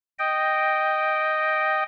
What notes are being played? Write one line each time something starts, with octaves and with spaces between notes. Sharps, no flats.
D#5 G5